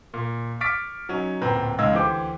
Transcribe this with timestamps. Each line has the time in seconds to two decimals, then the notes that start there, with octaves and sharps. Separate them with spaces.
0.14 A#2
0.61 C#6 D6 F6 A6 B6 D7
1.09 F#3 C#4 D#4
1.42 D1 A#2 C4 B4 A#5
1.79 C#2 G#3 D#4 F5 E6 G#6
1.92 D2 E3 G4 C5 D6